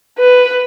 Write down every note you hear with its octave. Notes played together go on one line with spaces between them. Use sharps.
B4